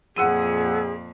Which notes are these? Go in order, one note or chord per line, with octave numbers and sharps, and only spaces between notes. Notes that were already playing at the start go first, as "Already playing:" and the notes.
F2 A#2 G#4 F#5 E6 D#7